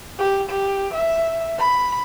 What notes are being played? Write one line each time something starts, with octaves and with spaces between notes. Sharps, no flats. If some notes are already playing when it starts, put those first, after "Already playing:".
G4
G4
E5
B5